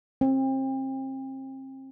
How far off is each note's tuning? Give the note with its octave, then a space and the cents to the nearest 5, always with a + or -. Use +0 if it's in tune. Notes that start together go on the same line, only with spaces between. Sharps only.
C4 +30